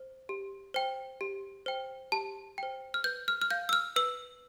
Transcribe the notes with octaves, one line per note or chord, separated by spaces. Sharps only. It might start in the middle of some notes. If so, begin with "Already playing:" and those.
Already playing: C5
G4
C5 G5
G4
C5 G5
G4 A5
C5 G5
F6
B4 G6
F6
F6
F5 G6
E6
F6
B4 E6